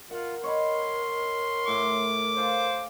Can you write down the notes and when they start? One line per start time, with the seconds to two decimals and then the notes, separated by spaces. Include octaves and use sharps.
0.11 F4 A#4 F#5
0.44 C#5 D#5 B5 C6
1.67 A2 D6
2.38 F4 C5 G#5